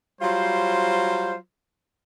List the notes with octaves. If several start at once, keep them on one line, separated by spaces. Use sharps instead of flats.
F#3 G3 F4 C5